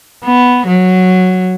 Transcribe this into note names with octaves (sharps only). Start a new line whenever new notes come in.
B3
F#3